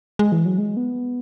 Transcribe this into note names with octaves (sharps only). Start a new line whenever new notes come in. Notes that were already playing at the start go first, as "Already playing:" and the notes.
G#3
E3
F#3
G#3
B3